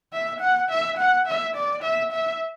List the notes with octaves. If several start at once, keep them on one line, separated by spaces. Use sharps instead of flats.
E5
F#5
E5
F#5
E5
D5
E5
E5